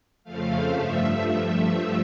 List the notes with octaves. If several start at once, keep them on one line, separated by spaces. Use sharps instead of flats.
F2 C#3 F3 A3 F5
G2 F3 A3 E5